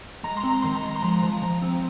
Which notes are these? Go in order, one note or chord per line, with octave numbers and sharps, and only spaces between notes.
G#3 A#5
C6
C4
A#5
D#3 C6
A#5
G#3
C6
F3 A#5
F3
F3
C4